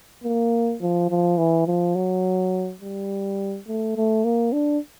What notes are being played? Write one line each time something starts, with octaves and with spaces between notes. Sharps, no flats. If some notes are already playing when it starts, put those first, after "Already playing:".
A#3
F3
F3
E3
F3
F#3
G3
A3
A3
A#3
D4